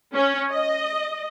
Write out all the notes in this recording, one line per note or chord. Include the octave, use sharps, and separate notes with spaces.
C#4
D#5